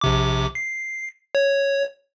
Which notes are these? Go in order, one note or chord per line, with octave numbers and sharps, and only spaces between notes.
A#1 C3 D6
C7
C#5